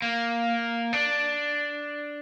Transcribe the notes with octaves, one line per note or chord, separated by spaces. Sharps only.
A#3
D4